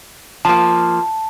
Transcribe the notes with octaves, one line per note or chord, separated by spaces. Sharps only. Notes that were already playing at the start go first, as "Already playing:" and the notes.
F3 A#3 A5